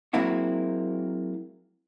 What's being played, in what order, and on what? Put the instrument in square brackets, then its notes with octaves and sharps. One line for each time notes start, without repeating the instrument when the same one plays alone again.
[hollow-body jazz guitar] F#3 G#3 A#3 C4 E4 F#4